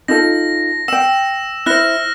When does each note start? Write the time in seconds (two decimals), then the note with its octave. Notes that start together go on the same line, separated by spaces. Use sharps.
0.08 D#4 F4 A4 A#6
0.88 F5 G5 E6 E7
1.66 E4 C5 F6 F#6 A#6